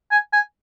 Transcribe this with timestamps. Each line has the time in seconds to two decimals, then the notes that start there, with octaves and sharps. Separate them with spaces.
0.11 G#5
0.33 G#5